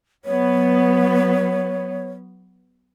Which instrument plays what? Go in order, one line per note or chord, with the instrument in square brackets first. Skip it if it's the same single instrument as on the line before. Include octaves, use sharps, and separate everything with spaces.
[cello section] F#3 B3 [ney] C#5